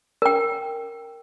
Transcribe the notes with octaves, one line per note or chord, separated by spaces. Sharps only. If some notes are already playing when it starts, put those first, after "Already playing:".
A#4 G5